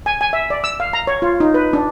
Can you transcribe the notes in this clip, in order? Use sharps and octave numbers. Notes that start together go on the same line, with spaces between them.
G#5
G#5
E5
D5
E6
F5
A#5
C#5
F4
D#4
B4
D4